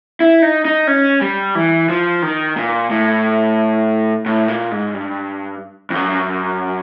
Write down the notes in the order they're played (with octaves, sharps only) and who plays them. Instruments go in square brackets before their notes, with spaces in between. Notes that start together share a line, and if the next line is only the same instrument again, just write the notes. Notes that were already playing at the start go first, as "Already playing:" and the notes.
[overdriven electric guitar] E4
D#4
D#4
C#4
G3
E3
F3
D#3
A#2
A2
A2
A#2
G#2
G2
F2
F#2